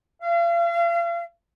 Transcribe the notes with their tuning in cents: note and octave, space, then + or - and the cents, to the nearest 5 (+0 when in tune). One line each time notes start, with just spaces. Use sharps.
F5 -40